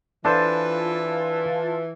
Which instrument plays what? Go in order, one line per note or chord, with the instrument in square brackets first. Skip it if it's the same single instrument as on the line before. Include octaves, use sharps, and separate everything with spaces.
[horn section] E3 [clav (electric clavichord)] D4 A4 C5 [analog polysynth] F4 A5 [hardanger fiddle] B4